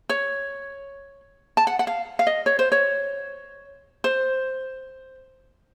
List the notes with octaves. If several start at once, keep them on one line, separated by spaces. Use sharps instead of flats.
C#5
A5
F#5
F#5
F5
F5
D#5
C#5
C5
C#5
C5